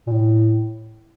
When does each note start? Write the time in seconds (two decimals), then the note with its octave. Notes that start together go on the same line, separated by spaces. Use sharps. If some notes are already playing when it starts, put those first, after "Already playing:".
0.07 A#2
0.11 A2